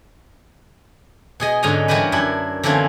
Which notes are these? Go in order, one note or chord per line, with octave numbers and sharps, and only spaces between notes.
B2 G#4 D#5
G#2 D3 G#3 C#4 D#5 A#5
E3 G3 F#4 G4 A#4 B4
F#2 D4 E4
D3 E3 F3 A#3 C4 C#4